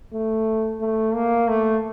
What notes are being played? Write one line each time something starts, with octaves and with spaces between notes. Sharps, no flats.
A3
A3
A#3
A3